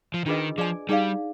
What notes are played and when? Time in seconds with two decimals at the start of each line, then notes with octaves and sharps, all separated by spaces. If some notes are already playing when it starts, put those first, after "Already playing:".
0.14 F3
0.26 D#3 D4 F4 G#4 B4 D#5
0.57 F3 G#4 D5 G#5
0.89 G3 D#4 G#4 D5 F5